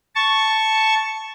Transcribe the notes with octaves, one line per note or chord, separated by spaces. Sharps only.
A5 C#6